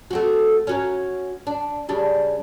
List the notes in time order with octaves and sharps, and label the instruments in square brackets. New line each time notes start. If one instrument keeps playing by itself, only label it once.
[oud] A3 C4 F#4
C#4 F#4 A#4
D4
C#3 G3 D4